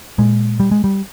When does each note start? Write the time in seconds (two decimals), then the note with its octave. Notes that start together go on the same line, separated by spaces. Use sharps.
0.18 A#2 G#3
0.60 G3
0.71 G#3
0.84 G3